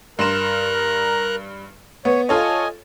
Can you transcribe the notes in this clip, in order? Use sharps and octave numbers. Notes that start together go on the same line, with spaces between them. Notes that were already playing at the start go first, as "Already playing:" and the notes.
G2 A#4 A#5 C6 F#6 E7
B3 C#5
F4 A4 C#5 D#5 G#5